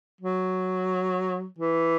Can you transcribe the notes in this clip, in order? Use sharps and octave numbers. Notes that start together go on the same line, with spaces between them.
F#3
E3